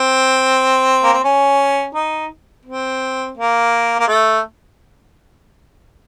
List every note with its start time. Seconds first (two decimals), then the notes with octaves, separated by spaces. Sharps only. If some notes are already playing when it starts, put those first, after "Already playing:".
Already playing: C4
1.03 A#3
1.13 C4
1.24 C#4
1.95 D#4
2.65 C4
3.37 A#3
3.99 A#3
4.08 A3